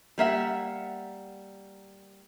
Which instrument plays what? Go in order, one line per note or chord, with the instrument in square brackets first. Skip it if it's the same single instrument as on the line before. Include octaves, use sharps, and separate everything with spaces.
[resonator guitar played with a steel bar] G3 A#3 E5 F#5